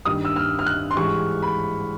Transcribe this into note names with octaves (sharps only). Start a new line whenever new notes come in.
G2 D#3 G3 D#6
E6
F6
F6
F#6
C6
G#2 E3 G3 C#6
B5